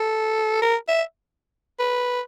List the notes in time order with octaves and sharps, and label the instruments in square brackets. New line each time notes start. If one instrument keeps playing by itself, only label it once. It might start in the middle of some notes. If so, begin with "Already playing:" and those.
Already playing: [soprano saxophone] A4
A#4
E5
B4